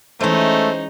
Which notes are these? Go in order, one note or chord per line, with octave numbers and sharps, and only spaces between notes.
E3 G#3 A3 C#4 D#4 C5